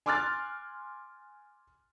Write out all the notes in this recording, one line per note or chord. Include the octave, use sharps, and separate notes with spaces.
G#5 C6 D6 F6 F#6 A6